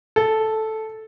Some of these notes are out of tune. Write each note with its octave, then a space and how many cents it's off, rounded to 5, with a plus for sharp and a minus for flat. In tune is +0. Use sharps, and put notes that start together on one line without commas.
A4 -5